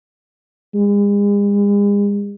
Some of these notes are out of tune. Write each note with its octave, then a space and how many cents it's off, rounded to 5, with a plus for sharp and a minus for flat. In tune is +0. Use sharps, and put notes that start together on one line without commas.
G#3 -40